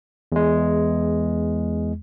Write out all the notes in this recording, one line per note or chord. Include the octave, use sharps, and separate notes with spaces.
E2 G#3